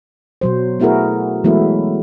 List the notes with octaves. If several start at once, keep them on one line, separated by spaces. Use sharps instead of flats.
B2 F#3 C5
A3 B3 E4 F#4 G#4 A#4
E3 F#3 G#3 A3 B3 E4